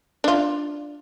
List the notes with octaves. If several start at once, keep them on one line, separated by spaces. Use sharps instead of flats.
D4 F4